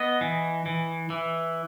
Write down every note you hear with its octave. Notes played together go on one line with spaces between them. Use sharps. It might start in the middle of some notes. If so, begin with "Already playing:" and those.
Already playing: B3 D#5
E3
E3
E3